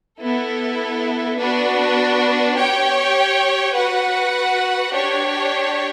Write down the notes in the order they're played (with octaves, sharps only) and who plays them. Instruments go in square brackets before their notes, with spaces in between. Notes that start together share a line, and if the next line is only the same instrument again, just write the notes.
[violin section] B3 E4 A4
B3 D4 F#4 B4
G4 C#5 G5
F#4 B4 F#5
D4 G4 C#5